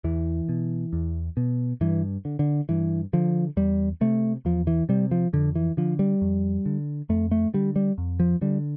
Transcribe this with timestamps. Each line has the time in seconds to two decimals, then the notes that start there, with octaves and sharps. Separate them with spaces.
0.04 E2 E3
0.49 B2
0.93 E2
1.37 B2
1.81 G2 E3
2.25 D3
2.39 D3
2.69 G2 E3
3.13 D3 F3
3.57 E2 G3
4.01 C3 A3
4.45 E2 F3
4.67 E3
4.89 C3 G3
5.11 F3
5.33 F2 D3
5.55 E3
5.77 D3 F3
5.99 G3
6.22 F2
6.66 D3
7.09 F2 A3
7.31 A3
7.54 D3 G3
7.76 G3
7.98 F2
8.20 F3
8.41 D3 G3